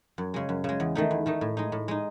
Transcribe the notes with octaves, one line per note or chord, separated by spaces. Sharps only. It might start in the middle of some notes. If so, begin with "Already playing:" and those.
F#2
C#3 G#3
F#2
C#3 G#3
E2
D#3 A3 D#4
E2
D#3 A3 D#4
A2
G#3 D#4
A2
G#3 D#4